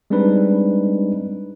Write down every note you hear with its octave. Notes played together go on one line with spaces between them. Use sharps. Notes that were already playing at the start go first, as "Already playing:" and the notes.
G3 G#3 C4 D4 D#4 B4